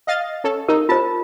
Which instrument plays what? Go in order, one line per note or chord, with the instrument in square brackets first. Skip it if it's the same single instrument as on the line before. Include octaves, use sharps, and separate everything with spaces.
[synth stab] D#5 F5 A6
C#4 A4
[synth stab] D#4 [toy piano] A#4
[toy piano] F4 C5 [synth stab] A5